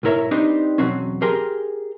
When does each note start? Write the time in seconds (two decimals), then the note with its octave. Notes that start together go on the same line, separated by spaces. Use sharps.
0.03 B1 G#2 E4 A#4 C#5 E5
0.31 C4 D4 D#4 G4 B4 C5
0.78 E2 G#2 B2 F#3 C4 C#4
1.22 G4 G#4 A#4 A#5 C6